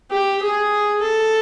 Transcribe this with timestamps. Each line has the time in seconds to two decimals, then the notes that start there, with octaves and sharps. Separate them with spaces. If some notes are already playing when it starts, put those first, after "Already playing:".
0.11 G4
0.42 G#4
1.01 A4